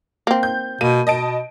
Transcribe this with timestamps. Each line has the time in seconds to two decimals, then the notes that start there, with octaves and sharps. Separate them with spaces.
0.27 A#3 C4
0.43 G6
0.81 B2 A#3 D#7
1.07 B2 D#5 A5 D7